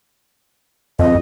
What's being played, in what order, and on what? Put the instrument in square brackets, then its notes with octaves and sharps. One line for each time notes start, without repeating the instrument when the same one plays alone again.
[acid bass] F2 [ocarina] D#5